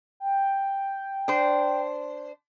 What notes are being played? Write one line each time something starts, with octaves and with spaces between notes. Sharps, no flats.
G5
D4 C5